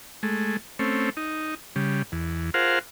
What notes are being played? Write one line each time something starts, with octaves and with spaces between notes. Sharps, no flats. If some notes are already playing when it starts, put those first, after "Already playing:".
G#3 A3
A3 C4 C#4
D#4
C#3 G3
E2
F4 G#4 A#4 C5 F5 F#5